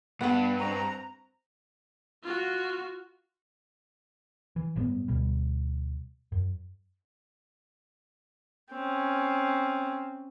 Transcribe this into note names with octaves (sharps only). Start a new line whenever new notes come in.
G2 B3 B4 F#5
C4 A#5 C#6
F4 F#4
E3
G1 A2 G3 B3
D2 B2 G3
F#2
C4 C#4